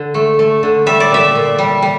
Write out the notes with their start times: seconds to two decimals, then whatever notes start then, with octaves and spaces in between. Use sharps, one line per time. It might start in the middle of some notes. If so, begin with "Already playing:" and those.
Already playing: D3
0.14 A3
0.39 A3
0.63 D3
0.86 G3 E5
1.00 D5
1.10 A#2 E5
1.35 A#2
1.58 G3
1.82 G3